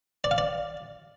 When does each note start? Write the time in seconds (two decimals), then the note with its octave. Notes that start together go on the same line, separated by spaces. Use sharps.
0.24 D5
0.31 F5
0.38 D5